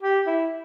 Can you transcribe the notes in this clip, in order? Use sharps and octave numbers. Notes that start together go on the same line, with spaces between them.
G4
E4